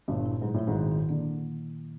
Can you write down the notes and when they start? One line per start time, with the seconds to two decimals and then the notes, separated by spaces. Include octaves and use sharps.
0.08 G1 G2 A#2
0.26 E4
0.41 G#2 F#3
0.54 A2 E4
0.67 G#1 G#2
0.76 D#3
0.92 D#3
1.09 D3 A#3